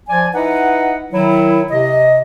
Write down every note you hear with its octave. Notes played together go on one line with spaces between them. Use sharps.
F3 D5 G#5
D#4 E4 B4 D#5 F#5
D#3 F#3 E4
C3 D#5